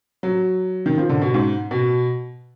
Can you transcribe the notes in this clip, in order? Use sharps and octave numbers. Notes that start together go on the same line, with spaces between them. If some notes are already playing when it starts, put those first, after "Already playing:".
F#3
D#3
F3
D3
B2
G#2
B2